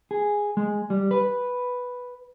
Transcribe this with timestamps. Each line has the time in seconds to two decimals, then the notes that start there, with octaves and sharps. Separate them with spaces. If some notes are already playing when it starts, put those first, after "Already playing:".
0.11 G#4
0.57 G#3
0.90 G3
1.11 B4